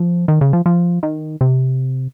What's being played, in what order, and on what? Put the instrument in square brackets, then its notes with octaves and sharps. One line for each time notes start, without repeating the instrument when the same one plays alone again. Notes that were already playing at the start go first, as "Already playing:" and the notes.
Already playing: [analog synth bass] F3
D#3
C#3
F3
F3
D#3
C3